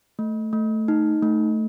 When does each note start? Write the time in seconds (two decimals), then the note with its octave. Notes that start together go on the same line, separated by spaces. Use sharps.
0.19 A3
0.53 A3
0.88 D#4
1.23 A3